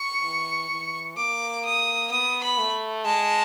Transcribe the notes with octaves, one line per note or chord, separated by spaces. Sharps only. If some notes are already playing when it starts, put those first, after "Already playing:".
Already playing: C#6
E3
E3
A#3 D6
D#6
B3 D#6
B5
A3
G#3 A5